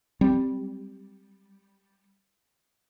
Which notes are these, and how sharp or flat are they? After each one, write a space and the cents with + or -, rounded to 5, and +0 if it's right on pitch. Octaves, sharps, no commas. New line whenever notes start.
G3 +0 C4 +0